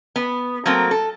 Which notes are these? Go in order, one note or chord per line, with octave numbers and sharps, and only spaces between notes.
B3
F#3 A3 A#3 C4
A4